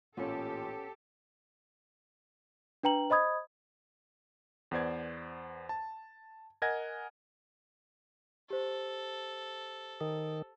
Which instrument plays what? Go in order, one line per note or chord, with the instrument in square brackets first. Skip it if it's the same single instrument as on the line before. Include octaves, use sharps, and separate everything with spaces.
[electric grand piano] A1 A#2 F4 [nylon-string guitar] B3 C#4 [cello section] G4 A4
[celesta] D4 B4 G5 A#5 F#7
C5 D#5 B5 D#6 G#6
[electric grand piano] E2 B3 C5 D5 G#6
A5
A#4 D#5 F#5 G#5 G#6 A#6
[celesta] G4 C5 [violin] A4
[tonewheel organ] D#3